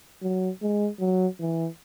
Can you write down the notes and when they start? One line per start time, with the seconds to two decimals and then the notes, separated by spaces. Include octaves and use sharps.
0.22 F#3
0.62 G#3
1.00 F#3
1.40 E3